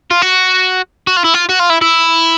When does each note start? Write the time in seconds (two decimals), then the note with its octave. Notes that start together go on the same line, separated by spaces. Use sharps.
0.11 F4
0.22 F#4
1.07 F#4
1.17 F4
1.25 E4
1.34 F4
1.49 F#4
1.60 F4
1.70 E4
1.82 E4